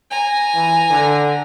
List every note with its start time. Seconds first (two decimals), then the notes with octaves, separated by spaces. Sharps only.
0.10 G#5 A#5
0.54 E3
0.90 D3